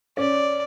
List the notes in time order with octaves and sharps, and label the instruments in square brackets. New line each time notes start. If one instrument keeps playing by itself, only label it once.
[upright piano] C#4 [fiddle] D5